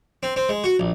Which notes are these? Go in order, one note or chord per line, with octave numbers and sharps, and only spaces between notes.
C4
C4
G#3
F#4
A#1